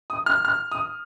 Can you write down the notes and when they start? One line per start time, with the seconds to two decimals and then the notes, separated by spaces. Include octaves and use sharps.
0.10 D#6
0.26 F6
0.45 F6
0.71 D#6